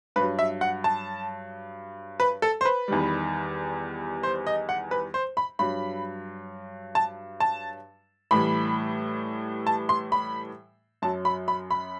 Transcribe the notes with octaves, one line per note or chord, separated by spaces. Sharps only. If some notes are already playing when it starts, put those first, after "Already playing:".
G2 F#3 B4
E5
F#5
A5
B4
A4
C5
B4
E2 D#3 G3
C5
D#5
F#5
B4
C5
B5
G2 F#3 B5
A5
A5
A2 E3 G3 B5
A5
C6
B5
F#2 F#3 A5
B5
B5
B5